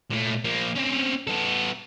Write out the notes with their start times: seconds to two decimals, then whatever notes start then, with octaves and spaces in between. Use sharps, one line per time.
0.10 A#2 A3
0.45 F3 A#3
0.75 C4 C#4
1.27 B3 A4